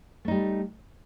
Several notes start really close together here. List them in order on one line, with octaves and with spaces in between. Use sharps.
A3 D#4 G3